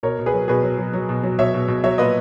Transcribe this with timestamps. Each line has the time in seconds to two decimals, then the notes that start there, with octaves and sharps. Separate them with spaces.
0.03 B2 A#4 C#5
0.19 B2
0.26 G#4 B4
0.34 F#3
0.48 B2 G#4 B4
0.63 F#3
0.78 F#3
0.93 F#3
1.09 B2
1.23 F#3
1.39 B2 C#5 E5
1.54 B2
1.68 B2
1.84 F#3 C#5 E5
1.98 A#2 B4 D#5